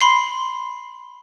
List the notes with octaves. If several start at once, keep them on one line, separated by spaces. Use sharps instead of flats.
B5 C6 C7